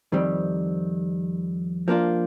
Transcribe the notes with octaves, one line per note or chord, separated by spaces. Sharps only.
F2 D#3 G3 C4
F3 A#3 D4 F4